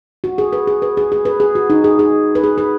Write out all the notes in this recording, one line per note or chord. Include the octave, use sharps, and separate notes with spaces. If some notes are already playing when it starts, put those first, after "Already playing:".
F#4
G#4
B4
G#4
B4
G#4
G#4
B4
G#4
F#4
D#4
G#4
G#4
B4
G#4
B4